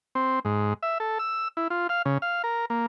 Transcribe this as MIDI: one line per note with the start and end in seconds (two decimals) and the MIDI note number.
0.15 0.39 60
0.45 0.74 44
0.83 0.98 76
1.00 1.18 69
1.19 1.48 88
1.57 1.68 64
1.70 1.87 65
1.89 2.02 77
2.05 2.18 49
2.22 2.42 77
2.44 2.65 70
2.70 2.86 58